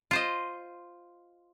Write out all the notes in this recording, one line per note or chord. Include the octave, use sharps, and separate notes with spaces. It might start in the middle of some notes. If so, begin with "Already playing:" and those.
F4 C5 D#5